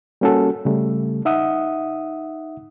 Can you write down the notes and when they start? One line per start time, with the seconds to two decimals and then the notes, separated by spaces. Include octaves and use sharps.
0.21 G3 A#3 C#4 F#4 A4
0.65 C#3 G3 A3
1.25 D#4 E5 F#5 D#6